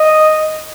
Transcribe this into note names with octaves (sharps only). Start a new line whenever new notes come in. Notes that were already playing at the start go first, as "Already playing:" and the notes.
Already playing: D#5